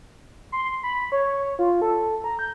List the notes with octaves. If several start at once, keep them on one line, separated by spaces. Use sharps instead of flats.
C6
B5
C#5
F4
A4
A#5
G6